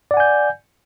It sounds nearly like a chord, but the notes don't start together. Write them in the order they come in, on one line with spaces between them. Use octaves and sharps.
D5 F#5 G#5 G6